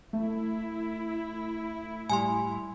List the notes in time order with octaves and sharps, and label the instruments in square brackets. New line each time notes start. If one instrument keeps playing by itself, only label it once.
[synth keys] A3 [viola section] E4
[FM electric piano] A2 G3 [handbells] G#5 C6